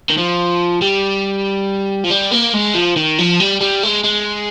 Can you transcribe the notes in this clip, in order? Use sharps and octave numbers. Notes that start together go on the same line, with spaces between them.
D#3
F3
G3
F3
G3
A#3
G#3
F3
D#3
F3
G3
G3
G#3
G#3